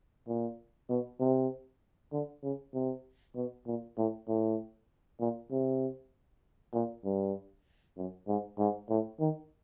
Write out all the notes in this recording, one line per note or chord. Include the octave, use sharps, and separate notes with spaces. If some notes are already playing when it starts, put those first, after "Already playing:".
A#2
B2
C3
D3
C#3
C3
B2
A#2
A2
A2
A#2
C3
A#2
G2
F#2
G#2
G#2
A2
D#3